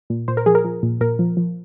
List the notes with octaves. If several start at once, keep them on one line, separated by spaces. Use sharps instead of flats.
A#2
A#2 C5
A#4
F3 G#4
A#4
F3
A#2
A#2 A#4
F3
F3